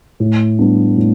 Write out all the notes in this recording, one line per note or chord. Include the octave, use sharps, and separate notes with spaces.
A2
G3 B3 D4
A2